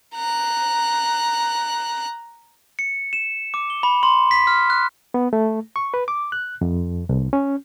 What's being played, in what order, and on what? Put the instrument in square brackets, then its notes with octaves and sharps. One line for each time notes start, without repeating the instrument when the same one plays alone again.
[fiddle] A#5 F#6
[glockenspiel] C#7
E7
D6
G7
B5
C6
B6
F6
F#6
[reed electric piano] B3
A3
C#6
B4
D6
F#6
F2
C2
C#4